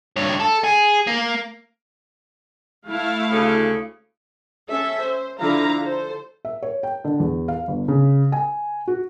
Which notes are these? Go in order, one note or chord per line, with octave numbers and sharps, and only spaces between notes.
G2 C#5
A4
G#4
A#3
A3 E4 F5
D2 C#3 A4
C#4 A4 E5
C5
D3 F3 E4 F5 A#5
A4 C5
E5
C#5
G5
D3
E2
F5
G1
C#3
G#5
F#4